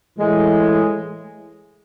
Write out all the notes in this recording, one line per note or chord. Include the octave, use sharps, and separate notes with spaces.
A2 E3 G#3